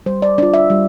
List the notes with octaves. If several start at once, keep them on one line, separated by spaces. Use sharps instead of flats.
G3 C5
D5
D4 F4 D5
E5
G3